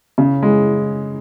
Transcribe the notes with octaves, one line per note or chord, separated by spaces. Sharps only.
C#3
G#3